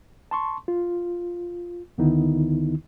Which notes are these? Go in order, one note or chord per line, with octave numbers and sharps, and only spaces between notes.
A5 C6 C#6
F4
D2 D3 D#3 B3 D#4 E4